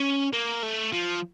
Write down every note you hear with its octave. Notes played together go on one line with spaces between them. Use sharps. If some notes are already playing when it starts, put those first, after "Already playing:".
Already playing: C#4
A#3
A3
F3